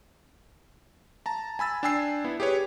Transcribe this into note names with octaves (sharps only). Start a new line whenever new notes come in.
A5 A#5
G#5 B5 E6 A6
D4 G5 G#5 E6 C7
B3 E4
G4 G#4 B4 C#5